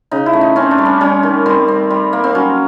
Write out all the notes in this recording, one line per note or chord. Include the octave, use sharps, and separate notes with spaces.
C#3 D#4
E4
A3
D#4
C4 C#4
D4
G3
C#4
G3 C#4
D#3
G3 C4
C4
G3
A#3
C4
F#3 C#4